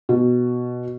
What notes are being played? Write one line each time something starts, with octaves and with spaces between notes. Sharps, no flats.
B2